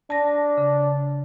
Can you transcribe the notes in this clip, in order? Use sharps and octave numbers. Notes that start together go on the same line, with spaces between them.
D4 A5 A#6
C#3